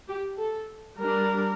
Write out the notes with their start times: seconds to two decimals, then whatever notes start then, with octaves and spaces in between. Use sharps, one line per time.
0.08 G4
0.38 A4
0.99 G3 D4 A#4